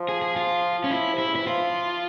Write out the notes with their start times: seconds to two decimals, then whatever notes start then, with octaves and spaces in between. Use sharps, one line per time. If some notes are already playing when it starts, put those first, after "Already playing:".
Already playing: F3
0.09 G#4
0.22 G#4
0.36 F4
0.84 C#4
0.91 E4
1.14 C3 E4
1.26 C#3
1.35 E3 E4
1.47 F3 F4